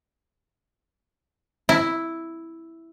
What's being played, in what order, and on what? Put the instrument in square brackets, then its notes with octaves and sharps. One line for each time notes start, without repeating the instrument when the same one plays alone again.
[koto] E4